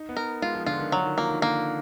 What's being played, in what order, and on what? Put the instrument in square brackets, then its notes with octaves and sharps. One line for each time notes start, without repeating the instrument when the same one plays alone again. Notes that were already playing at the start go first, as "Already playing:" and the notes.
Already playing: [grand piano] D#4
B3
[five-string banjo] A#4
[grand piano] G#3 [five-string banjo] F4
[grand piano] F3
[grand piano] D3 [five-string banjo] F4
[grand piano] D#3
[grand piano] D3 [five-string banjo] F#3
[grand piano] D#3
[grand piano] F3 [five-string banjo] A#3
[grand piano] D#3
[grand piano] D3 [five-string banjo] A#3